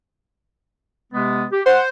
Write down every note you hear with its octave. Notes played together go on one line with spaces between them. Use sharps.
C3 G#3 B3
G4
C5 F#5